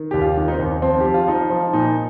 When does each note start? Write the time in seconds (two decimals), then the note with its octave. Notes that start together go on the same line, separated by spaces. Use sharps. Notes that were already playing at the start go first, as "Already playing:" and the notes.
Already playing: D#3
0.11 D#2 G4
0.22 F4
0.37 D#3
0.48 D#4
0.52 C4
0.59 D#2
0.82 F3 C4
1.00 F3 G4
1.14 F4
1.28 F3 D#4
1.50 F3
1.73 A#2 D#4